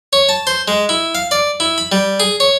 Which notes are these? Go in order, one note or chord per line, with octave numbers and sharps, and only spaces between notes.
C#5
A5
C5
G#3
E4
F5
D5
E4
B5
G3
G#4
C#5